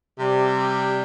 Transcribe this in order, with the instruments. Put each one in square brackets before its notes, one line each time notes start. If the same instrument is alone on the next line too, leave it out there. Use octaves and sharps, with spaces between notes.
[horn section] C3 G3